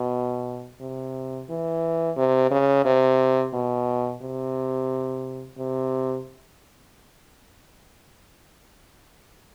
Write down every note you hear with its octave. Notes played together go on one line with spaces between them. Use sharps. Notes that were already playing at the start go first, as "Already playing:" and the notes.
Already playing: B2
C3
E3
C3
C#3
C3
B2
C3
C3